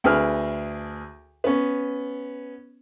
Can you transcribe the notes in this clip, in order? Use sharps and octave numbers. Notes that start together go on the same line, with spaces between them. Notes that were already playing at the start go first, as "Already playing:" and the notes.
D2 D3 G#4 B4 F6
B3 C#4